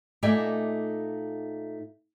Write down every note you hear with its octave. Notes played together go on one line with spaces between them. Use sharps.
A#2 A3 D#4 D5 E5 G#5